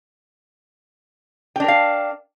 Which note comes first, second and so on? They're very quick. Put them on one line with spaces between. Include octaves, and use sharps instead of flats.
G5 D4 A#4 F5